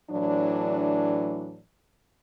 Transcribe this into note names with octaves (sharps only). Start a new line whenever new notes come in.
A2 E3 F#3 D4